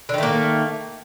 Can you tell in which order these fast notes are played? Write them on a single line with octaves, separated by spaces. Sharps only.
D3 D#3 A3 A#3